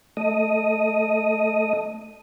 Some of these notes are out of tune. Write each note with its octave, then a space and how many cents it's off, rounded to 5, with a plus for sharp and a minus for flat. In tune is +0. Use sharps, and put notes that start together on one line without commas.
A3 +0 D#5 +0